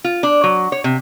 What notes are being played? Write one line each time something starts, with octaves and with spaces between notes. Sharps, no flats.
F4
D4
F#3
C#5
C3